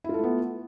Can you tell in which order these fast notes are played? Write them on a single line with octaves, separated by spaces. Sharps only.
E4 F4 A4 A3 B3